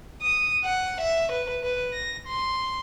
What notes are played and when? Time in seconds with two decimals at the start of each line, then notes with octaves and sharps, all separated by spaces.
0.21 D#6
0.65 F#5
1.01 E5
1.32 B4
1.63 B4
1.93 A#6
2.27 C6